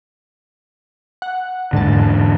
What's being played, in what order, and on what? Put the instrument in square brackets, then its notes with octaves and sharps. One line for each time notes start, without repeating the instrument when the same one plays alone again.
[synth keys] F#5
[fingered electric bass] E2 D3 [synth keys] G#2 A5